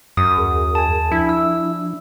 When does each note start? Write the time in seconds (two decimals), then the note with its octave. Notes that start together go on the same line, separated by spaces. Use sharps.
0.17 F#2 D#6
0.38 D#2 G#4 A#4
0.75 G#5 A5
1.11 F3 D4 E4
1.29 E6